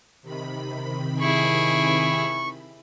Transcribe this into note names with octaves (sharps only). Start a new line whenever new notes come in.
C3 D#3 B5
E4 G#4 C#6